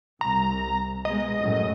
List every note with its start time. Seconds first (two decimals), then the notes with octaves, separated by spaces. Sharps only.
0.21 C2 A#5
1.05 B2 G#3 D#5
1.39 F#2 A2 F#3